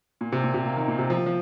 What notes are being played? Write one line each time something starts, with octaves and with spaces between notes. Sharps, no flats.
A#2
C3
A#2
C3
A#3
D#3
A#2
C3
F3
F3